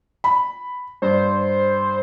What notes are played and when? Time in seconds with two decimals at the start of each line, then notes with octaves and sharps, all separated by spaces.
0.24 B5
1.02 G2 C5